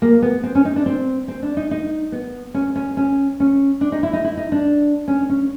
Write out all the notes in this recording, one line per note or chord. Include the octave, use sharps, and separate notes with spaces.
A#3
B3
C4
C#4
D#4
D4
C4
C4
D4
D#4
D#4
B3
C#4
C#4
C#4
C#4
D4
D#4
E4
D#4
E4
D#4
D4
C#4
C#4